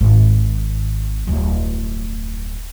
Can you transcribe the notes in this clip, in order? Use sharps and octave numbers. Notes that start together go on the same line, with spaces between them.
G#1
D1 F2